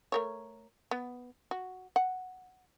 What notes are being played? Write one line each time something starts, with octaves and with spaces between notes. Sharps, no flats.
A3 A#4 C#5
B3
F#4
F#5